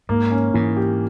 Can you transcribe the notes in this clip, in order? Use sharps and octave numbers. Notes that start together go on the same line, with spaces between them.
G#2 A#3
C#4
G#2 E3
G4